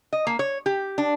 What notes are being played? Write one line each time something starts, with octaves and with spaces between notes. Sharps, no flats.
D#5
A#3
C#5
G4
D4